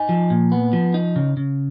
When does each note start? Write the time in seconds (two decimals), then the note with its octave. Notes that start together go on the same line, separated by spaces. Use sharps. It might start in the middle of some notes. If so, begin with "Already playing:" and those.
Already playing: D#4 G#5
0.09 F3
0.30 A#2
0.52 B3
0.73 F3
0.94 D#4
1.16 C#3
1.37 C#3